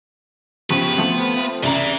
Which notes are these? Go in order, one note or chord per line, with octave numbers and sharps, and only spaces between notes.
C#3 F3 B3 G4 B4 C#6
F3 A3 B3 C4
C2 C#3 E3 D5 A#5